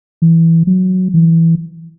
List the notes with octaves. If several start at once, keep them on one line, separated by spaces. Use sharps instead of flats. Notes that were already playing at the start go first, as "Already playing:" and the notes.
E3
F#3
E3